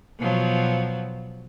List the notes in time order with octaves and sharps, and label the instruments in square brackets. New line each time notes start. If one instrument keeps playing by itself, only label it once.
[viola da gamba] B2 F3 F#3